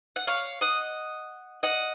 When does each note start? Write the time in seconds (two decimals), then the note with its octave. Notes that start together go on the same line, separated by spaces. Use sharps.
0.16 F#5
0.27 C#5 F5
0.61 D#5 F#5
1.63 D#5 F#5